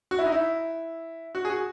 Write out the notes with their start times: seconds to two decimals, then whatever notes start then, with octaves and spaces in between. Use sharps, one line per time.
0.11 F#4
0.19 E4
0.26 D#4
0.32 E4
1.35 F#4
1.45 G#4
1.50 F#4